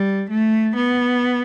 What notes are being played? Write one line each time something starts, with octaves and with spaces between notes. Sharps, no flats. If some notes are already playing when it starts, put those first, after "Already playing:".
Already playing: G3
A3
B3